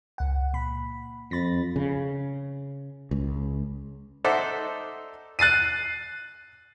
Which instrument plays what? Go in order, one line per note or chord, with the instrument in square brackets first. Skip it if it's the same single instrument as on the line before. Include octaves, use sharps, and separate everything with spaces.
[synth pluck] C#2 F#5
A#2 B5
[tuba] F2 [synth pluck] B5 A6 A#6
[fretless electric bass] C#3
C#2
[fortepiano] D#4 A4 C5 D5 E5 F#5
[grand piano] F#6 A6 C7 D#7